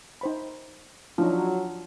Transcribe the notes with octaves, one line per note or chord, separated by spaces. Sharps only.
D#4 C5 B5
F3 F#3 D4 D#4